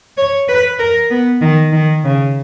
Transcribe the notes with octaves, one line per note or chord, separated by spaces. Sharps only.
C#5
B4
A#4
B3
D#3
D#3
C#3